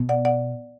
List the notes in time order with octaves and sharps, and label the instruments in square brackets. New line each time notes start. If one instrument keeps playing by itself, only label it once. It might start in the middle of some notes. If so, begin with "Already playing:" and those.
Already playing: [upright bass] B2
[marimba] D5 F#5
D5 F#5